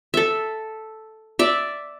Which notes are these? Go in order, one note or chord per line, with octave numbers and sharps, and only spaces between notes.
A4 E5
D5 E5